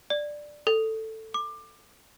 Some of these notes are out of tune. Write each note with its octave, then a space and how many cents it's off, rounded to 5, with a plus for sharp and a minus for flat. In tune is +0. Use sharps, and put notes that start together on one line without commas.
D5 +5
A4 +10
D6 +20